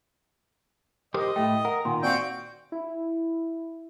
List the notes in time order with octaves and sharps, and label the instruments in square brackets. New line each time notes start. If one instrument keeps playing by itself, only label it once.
[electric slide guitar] G4 A#4 C5 [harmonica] D#5
[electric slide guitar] A2 A3 [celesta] G5
[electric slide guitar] A#4 [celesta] F#5
[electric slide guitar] A#2 D#3 [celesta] F#5 G#5 C6
[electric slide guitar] C4 F5 [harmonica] F#4 G5 [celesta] D5
[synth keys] E4